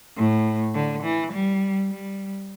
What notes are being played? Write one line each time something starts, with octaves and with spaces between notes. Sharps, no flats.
A2
D3
E3
G3
G3